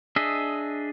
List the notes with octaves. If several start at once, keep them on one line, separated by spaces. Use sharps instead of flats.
D4 G#4 D#5 E5